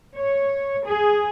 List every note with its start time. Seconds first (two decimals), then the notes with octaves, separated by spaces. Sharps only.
0.13 C#5
0.85 G#4